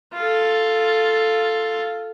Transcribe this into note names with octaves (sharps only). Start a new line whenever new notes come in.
F4 A4